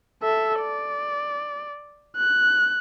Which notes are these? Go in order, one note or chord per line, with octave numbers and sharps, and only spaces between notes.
A4 E5
D5
F#6